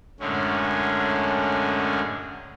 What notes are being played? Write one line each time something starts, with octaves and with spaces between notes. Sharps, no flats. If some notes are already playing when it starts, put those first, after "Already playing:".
F#2 A2 D3 G#3 C#4